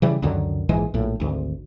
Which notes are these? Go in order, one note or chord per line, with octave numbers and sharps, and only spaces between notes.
C#3 E3 G3
C#2 F#2 D3 D#3
A#1 G#2 E3 G#3
A#1 A2
G#1 D2